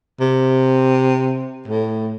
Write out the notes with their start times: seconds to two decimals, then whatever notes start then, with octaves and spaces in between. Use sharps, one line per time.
0.20 C3
1.67 A2